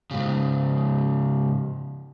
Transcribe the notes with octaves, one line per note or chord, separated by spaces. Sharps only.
G#2 C#3